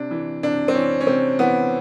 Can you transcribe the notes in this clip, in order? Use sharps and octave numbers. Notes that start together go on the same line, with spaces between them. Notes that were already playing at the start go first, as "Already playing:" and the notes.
Already playing: C3 D4
E3
C3 D4
C4
E3 C#4
C#4
C3 C4
E3 B3